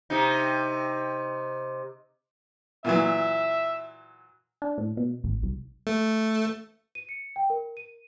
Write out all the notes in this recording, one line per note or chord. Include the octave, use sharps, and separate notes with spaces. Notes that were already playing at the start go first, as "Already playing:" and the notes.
C3 D#4
A#2 E3 F#3 E5
D4
A2
B2
A1
C2
A3
D#7
C#7
G5
A#4
D#7